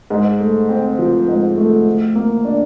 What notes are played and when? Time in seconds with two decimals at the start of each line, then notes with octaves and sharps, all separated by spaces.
0.10 G#2
0.40 A3
0.69 C4
0.99 F3
1.28 G#2
1.57 A3
1.86 A2
2.15 A#3
2.45 D4